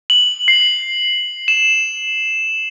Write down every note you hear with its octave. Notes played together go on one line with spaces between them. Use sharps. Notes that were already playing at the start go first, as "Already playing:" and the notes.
F#7
C7
E7